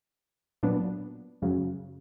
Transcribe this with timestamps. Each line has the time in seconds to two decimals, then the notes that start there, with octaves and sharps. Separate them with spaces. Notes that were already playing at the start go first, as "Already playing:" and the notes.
0.63 A#2 F#3 B3 D4
1.42 F#2 C#3 F#3